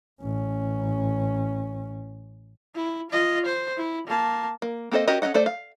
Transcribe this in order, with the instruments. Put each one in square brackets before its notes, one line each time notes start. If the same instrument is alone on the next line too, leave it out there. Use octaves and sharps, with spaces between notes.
[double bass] A1 C#4
[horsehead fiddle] E4
F4 D#5
C5
E4
A#3 A5
[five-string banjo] A#3
A#3 C4 A4 C5 D#5
C#4 F#4 G4 A#4 D#5
C#4 D4 A4 D#5 F#5
A3 A4 C5 D5
F5